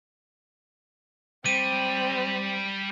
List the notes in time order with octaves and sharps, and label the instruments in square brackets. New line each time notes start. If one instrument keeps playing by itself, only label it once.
[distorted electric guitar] G3 [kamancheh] C4 [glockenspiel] D#7